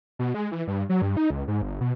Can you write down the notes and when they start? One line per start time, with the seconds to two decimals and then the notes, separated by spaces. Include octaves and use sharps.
0.19 B2
0.34 G#3
0.52 E3
0.67 G2
0.89 F#3
1.02 G2
1.17 D#4
1.30 C#2
1.48 G#2
1.62 G1
1.81 B2